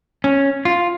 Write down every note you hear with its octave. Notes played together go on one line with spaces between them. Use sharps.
C#4
F4